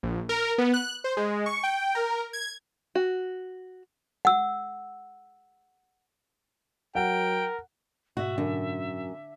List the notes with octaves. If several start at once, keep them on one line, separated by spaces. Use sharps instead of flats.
A#1
A#4
B3
F#6
C5
G#3
C#6
G5
A#4
G#6
F#4
F#5 E6
F#3 A#4 F#5 G5
G#2 B2 F#4 E5
F#2 D3